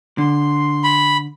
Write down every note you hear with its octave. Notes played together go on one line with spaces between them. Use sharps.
D3 C6
B5